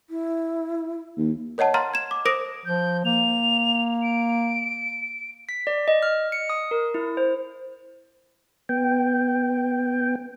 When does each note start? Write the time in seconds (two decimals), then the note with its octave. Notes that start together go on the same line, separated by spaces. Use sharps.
0.10 E4
1.17 D#2
1.58 A#4 C#5 D#5 F#5 A5
1.74 F5 A#5 C6 F6 A6
1.93 G#6 E7
2.11 D6
2.25 A#4 C5 D6 D#6 A#6 D7
2.65 F3 G6
3.05 A#3 F7
4.03 D7
5.49 B6
5.67 D5
5.88 D#5
6.02 F6
6.32 C#7
6.50 D#6
6.71 A#4
6.94 E4
7.17 C5
8.69 B3 G5